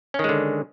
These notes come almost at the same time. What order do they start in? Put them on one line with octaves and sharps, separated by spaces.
C#4 D#3 G#3 D3